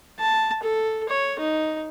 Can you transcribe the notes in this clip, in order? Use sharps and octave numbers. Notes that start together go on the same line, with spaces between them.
A5
A4
C#5
D#4